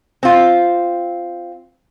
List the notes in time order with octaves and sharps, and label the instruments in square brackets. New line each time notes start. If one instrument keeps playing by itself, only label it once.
[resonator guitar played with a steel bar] C4 F4